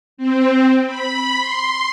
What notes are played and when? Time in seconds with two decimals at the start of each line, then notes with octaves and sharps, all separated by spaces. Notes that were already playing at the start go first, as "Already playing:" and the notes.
0.17 C4
0.87 B5
1.40 C6